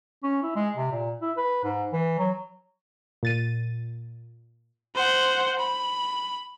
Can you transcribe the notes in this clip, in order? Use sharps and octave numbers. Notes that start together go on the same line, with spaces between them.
C#4
E4
G#3
C3
A#2
E4
B4
G#2
E3
F#3
A#2 A6 D#7
C5 F#5
B5